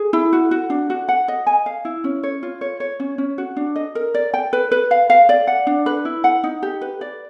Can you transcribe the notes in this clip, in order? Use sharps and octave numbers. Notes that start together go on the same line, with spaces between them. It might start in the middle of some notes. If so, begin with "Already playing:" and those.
Already playing: G#4
E4
F#4
F#4
D4
F#4
F#5
D#5
G#5
F5
E4
C#4
C#5
F4
C#5
C#5
C#4
C#4
F#4
D4
D#5
A#4
D5
G5
B4
B4
F5
F5
D5
F#5
D4
B4
E4
F#5
D#4
G4
B4
D5